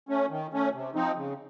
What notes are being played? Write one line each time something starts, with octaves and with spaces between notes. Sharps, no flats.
A3 C#4
D#3
A3 C#4
C3
F3 C4 D#4
C#3